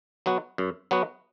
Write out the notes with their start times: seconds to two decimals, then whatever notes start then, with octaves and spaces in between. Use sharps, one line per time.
0.26 F#3 B3 F#4
0.58 F#2
0.91 F#3 B3 F#4